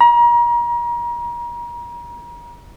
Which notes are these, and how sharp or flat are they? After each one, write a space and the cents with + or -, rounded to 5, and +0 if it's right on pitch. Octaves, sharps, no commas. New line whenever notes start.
A#5 +35